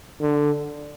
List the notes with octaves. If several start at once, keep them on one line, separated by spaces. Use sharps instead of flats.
D3